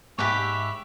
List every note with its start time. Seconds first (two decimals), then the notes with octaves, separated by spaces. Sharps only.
0.19 G#2 G4 B4 C#5 E5 D6